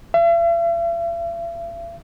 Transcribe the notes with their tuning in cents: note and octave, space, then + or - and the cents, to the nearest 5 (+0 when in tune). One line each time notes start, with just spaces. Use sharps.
E5 +45